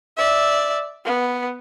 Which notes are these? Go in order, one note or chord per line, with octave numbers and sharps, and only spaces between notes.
D5 E5
B3